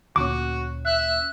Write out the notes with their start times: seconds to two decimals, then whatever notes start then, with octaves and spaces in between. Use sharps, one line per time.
0.16 D2 A#2 C#4 F#4 D6
0.85 E5 F#6